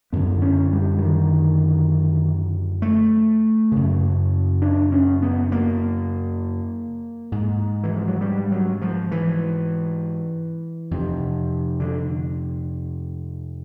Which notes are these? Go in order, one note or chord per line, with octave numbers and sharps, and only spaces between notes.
F#2 D3 B3
C#4
G3
E3
D#3
A3
F#2 C#3
D4
C#4
B3
A#3
G#2
E3
F3
F#3
G3
F#3
F3
E3
F2 C3
D3